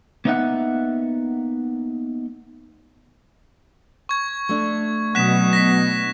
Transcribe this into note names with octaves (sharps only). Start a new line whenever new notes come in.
A#3 B3 D#4 D#5 E5 F#5
C#6 G#6
A3 D4
B2 F#3 D#6 F#6 B6 E7
A#6 B6